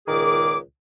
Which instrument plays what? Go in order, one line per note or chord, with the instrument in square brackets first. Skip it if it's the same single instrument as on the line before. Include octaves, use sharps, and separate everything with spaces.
[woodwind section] C#2 A#2 D#3 G#4 D6